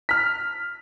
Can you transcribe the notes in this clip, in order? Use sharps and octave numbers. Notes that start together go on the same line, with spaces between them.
F6 B6